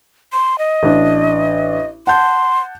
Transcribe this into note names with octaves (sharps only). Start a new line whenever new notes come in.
C6
D#5
A1 D4
F#5 A5 C6 G6